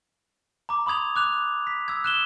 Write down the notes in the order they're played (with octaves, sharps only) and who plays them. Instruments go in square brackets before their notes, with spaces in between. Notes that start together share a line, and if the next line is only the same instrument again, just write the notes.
[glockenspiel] A#5 D6
B5 C6 D#6 G#6 F7
D6 F#6 F7
B6
E6 G#6
F#6 E7 G7